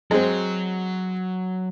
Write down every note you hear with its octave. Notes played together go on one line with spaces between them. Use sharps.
F#3 G#3 C4